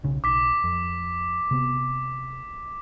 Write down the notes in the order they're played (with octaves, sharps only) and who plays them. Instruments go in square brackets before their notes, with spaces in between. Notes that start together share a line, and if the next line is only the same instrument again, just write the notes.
[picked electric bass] B1 C#3
[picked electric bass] B1 [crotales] D6 B6
[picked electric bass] F2
C3 B3